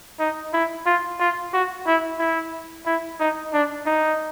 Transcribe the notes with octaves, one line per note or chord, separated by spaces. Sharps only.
D#4
E4
F4
F4
F#4
E4
E4
E4
D#4
D4
D#4